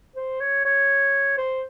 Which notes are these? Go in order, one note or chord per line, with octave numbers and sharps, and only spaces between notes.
C5
C#5
C#5
C5